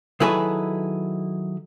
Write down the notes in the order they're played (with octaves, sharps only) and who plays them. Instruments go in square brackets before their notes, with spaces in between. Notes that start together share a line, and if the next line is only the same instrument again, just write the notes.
[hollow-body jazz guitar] D#3 F#3 E4 G#4 A4 B4